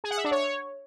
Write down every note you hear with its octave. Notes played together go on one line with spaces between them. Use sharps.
G#4
F#5
E5
D4
C#5